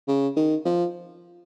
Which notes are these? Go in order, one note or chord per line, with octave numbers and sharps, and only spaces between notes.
C#3
D#3
F3